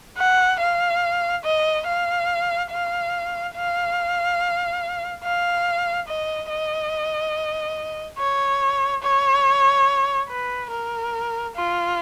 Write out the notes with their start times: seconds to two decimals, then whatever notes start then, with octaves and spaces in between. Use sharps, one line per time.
0.18 F#5
0.60 F5
1.44 D#5
1.86 F5
2.71 F5
3.55 F5
5.24 F5
6.08 D#5
6.50 D#5
8.18 C#5
9.03 C#5
10.29 B4
10.71 A#4
11.56 F4